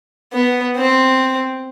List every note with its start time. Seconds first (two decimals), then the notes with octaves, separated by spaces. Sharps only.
0.33 B3
0.76 C4